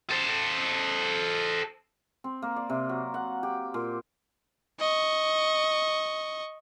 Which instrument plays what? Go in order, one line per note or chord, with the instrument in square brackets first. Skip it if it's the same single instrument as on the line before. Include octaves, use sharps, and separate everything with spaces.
[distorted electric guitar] A4 C5
[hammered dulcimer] C4
A#3
D5
C3
F#3
F#5
G4
A#2
[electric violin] D#5 C#6